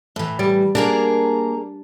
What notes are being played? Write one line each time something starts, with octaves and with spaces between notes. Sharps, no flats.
A2 E3
G3
A#3 D4 G#4 A#4